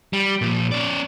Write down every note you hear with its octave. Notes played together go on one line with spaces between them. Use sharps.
G3
A#2 F3
C#4 D5